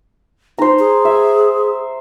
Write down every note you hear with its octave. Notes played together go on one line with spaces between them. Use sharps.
D#4 C5 A#5
G#4
E5